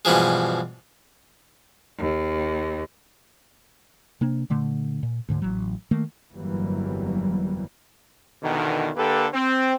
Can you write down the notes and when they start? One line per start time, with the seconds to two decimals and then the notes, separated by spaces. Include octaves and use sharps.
0.05 G2 B2 E3 F3 G#3
1.98 D#2
4.21 C3 A#3 D4
4.50 A#2 D3 A3
5.03 A#2
5.29 D2 G#2 D3
5.42 A1 F#3
5.91 D#3 A3 A#3
6.33 G1 F2 E3 F#3 G3 A#3
8.43 E2 B2 D3 D#3
8.97 D3 A#3 G4 A4 B4
9.34 C4